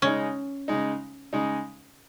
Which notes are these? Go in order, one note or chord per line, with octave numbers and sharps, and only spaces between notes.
C#3 G#3 C#4 D#4
C#3 G#3 D#4
C#3 G#3 D#4